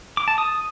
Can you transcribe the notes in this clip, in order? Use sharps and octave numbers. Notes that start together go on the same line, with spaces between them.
D6
A5
D#6